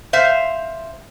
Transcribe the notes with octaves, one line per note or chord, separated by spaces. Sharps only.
C5 E5 F5